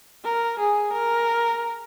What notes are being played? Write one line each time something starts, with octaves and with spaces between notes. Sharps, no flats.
A#4
G#4
A#4